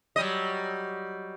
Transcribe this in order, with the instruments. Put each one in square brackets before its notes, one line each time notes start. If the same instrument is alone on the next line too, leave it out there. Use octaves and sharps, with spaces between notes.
[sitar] F#3 G3 D#5